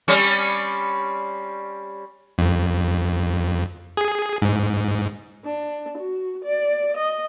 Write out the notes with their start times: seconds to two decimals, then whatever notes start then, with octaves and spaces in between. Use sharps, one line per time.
0.08 G3 C4 C#4
2.38 F2
3.97 G#4
4.42 G#2
5.45 D4
5.98 F#4
6.45 D5
6.97 D#5